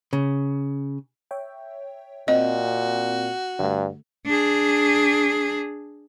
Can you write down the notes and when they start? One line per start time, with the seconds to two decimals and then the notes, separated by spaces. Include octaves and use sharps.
0.13 C#3
1.31 C#5 E5 G5
2.28 A#2 C4 F#4 D#5 G5
3.59 G2 D3 A3
4.26 D4 G#4